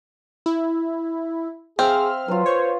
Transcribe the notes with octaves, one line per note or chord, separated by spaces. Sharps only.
E4
C4 G#4 C5 E5 F5 F6
F#3 F4 B4
C5 C#5